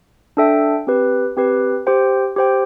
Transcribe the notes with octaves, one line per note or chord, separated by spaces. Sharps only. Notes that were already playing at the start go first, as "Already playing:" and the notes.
D4 A4 E5 G5
C4 G4 B4
C4 G4 B4
G4 C5 G5
G4 C5 G5